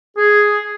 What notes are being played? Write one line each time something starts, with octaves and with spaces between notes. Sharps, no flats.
G#4